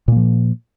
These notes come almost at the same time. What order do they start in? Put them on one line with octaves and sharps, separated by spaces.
A#2 A#3 F3